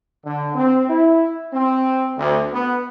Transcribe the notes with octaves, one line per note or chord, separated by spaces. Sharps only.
D3
C4
E4
C4
D2
B3